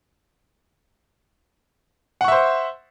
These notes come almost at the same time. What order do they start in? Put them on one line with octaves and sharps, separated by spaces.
F#5 C#6 E5 C5